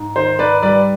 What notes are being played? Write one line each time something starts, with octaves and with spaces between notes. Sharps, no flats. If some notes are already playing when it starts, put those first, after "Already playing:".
Already playing: G#2
D#3 C5
G#2 B4 D5
G3 B4 D5